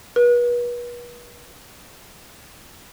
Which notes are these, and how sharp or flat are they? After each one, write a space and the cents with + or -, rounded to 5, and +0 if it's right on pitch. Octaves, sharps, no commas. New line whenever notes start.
B4 -35